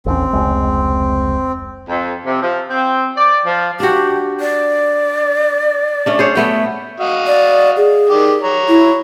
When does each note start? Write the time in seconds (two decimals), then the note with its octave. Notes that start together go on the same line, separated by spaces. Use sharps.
0.06 A1 D#2 C4 C#4
0.33 F1 C#2 G#3
1.88 F2
2.25 C3
2.41 F3
2.70 C4
3.17 D5
3.44 F3
3.80 D4 F#4 G4
4.40 D5
6.06 A3 C#4 D4
6.19 G#4 C5 C#5
6.35 A3 B3 E5 G5
7.00 F#4 D#5 F5
7.27 D5
7.77 G#4
8.10 D#3 G4 D5
8.42 C#5 A#5
8.68 E4